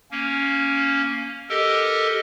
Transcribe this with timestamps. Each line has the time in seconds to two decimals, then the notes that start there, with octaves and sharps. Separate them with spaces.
0.11 A#3 C#4
1.49 G4 A4 A#4 D#5